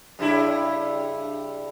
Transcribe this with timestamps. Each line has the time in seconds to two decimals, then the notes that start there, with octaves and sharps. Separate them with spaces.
0.19 G2 C#3 E4